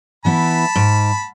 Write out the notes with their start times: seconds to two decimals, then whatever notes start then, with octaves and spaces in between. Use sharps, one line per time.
0.25 E3 B3 E4 A5 B5
0.75 G#2